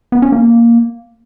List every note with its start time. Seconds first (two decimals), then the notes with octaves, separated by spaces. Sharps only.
0.12 B3
0.22 C#4
0.32 A#3